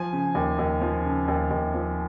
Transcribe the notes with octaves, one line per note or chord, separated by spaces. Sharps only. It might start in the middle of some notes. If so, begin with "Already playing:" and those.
Already playing: F3 G#5
C#3
D#2
D#2
F3
C#3
D#2
D#2
F3